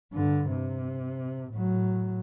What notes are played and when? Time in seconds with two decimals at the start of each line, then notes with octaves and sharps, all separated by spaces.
0.13 G2 D3
0.51 C3
1.53 A2 F#3